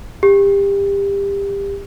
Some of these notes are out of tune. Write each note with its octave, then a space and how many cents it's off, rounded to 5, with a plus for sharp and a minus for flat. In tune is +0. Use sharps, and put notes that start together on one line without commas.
G4 +25